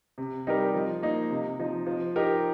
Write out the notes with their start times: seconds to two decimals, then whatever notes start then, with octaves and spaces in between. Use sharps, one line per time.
0.18 C3
0.47 G3 D#4 G4 A#4
0.74 F3
1.02 A#3 D#4
1.31 C3
1.59 F3 D#4
1.86 F3
2.16 D#4 G4 A#4